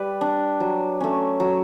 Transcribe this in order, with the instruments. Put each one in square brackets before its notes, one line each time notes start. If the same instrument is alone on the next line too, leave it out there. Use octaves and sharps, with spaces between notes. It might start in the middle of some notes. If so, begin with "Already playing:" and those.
Already playing: [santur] G3 B4 D5
D4
F#3
A3 C#4
F#3